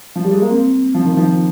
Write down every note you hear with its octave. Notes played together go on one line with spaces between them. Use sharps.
F3
G3
G#3
A#3
C4
F3
D#3
F3